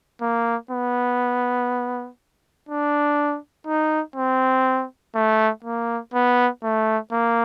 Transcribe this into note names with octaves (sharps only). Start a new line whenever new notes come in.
A#3
B3
D4
D#4
C4
A3
A#3
B3
A3
A#3